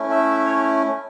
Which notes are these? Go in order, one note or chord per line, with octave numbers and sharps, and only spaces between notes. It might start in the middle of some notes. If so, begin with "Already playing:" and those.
Already playing: A3 C#4 E4
E5
C#5